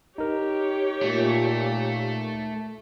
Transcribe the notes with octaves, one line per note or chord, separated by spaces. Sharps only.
D#4 G4 A#4 C#5
A#2 A3